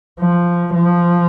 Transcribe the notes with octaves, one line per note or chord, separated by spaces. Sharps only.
F3
F3